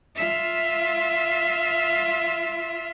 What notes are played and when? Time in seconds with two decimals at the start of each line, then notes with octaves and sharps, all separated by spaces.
0.16 F4 E5